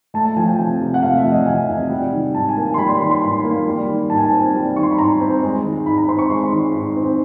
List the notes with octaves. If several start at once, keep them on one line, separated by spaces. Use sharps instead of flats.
A3 A5
A5
F3 G#5
G5
C3
C3
F#5
A3 F5
E5
F3
D#5
C3 G#5
C3
G3
D#3
G#2 A5
G#5
A#3
C6
G3 B5
C6
D#3 C6
C6
G#2 B5
A#3
G3
D#3
G#2 A5
G#5
A5
C4
G3
D#3 C#6
C6
B5
G#2 A#5
C4
G#3
D#3
G#2 B5
A#5
C4 C6
C#6
G#3 C6
D#3
G#2
C4